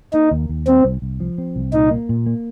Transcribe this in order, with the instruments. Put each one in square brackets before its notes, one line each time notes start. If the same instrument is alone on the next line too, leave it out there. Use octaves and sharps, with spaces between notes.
[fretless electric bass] A#3 [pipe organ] D#4
[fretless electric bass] D#2
D#2
[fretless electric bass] G3 [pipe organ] C4
[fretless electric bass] C2
C2
F3
C4
C2
[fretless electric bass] A#2 [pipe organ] D#4
[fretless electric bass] A#3
A#2
A#3